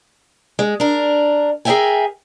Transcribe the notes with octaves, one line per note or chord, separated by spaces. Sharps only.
G#3
D4 A#4
G#4 A#4 C#5 E5 G5 G#5